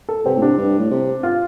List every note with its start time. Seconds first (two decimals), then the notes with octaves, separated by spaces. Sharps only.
0.09 A4
0.25 C3 C4
0.37 A2
0.42 C3 D4
0.58 G2
0.79 A2
0.91 C3
1.23 F4